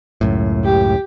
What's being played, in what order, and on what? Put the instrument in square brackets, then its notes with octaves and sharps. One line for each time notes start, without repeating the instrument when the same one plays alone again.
[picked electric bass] C#2 F#2 A2
[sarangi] G4